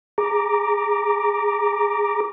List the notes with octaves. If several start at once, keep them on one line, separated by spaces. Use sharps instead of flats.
G#4 A#5 D6